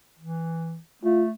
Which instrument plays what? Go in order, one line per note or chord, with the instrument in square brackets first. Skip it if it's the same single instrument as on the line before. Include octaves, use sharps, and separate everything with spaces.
[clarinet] E3
[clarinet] A3 [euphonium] F4